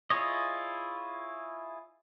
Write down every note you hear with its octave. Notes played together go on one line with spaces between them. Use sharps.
E4 F4 G#4 C#5 D#5